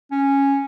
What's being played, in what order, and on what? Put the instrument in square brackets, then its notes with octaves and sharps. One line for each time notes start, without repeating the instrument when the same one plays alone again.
[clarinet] C#4